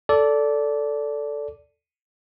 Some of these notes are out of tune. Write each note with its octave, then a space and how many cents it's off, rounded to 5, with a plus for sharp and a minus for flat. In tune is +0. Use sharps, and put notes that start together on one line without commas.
A4 +0 D5 -15